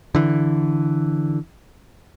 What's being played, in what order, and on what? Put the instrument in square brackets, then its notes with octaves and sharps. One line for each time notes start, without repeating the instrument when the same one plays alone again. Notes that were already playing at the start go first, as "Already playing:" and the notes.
[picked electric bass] D3 E3